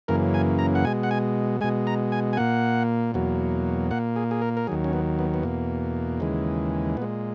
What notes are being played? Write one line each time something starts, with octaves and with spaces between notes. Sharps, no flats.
F#2 C#3 E3 A#3 A#4
G#5
A#5
F#5
B2 G#3 G#5
F#5
G#5
B2 G#3 G#5
A#5
G#5
G#5
A#2 A#3 F#5
E2 B2 F#3 A#3
A#2 A#3 F#5
G#4
G#4
A#4
A#4
D#2 D#3 F#3 G#4
C#4
B3
B3
B3
E2 B2 A#3
D#2 C#3 E3 G#3
A#2 G#3 B3